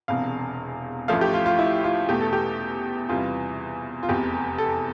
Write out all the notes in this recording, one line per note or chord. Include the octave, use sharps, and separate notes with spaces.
E1 E2 C3 F5
A1 A2 F3 A3 F5
G4
F4
F4
E4
F4
E2 B2 A3 G4
A4
G4
E2 C3 E3 G3 F4
F4
F1 E2 C3 G4
A4